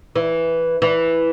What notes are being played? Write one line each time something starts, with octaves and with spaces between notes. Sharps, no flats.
E3
E3